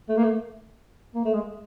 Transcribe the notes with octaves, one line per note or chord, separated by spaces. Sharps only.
A3
A#3
A3
A#3
A3
G#3